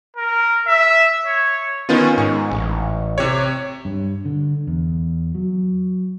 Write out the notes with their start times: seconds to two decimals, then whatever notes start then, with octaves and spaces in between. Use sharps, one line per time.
0.17 A#4
0.67 E5
1.26 C#5
1.89 D#3 B3 C#4 F4
2.18 G#2 C#6
2.51 A1
3.18 C3 G4 C#5
3.85 G2
4.25 D3
4.67 E2
5.35 F#3